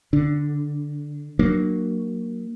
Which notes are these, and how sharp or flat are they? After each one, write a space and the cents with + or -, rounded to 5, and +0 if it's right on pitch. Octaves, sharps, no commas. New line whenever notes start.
D3 +0 D4 +0
F#3 +0 A#3 +0 D4 +30